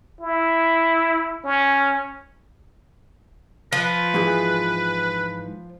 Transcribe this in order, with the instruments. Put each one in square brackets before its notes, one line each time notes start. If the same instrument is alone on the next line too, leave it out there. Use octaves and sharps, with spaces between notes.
[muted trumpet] E4
C#4
[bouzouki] F3 [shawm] B4
[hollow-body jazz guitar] G#2 E3 G#4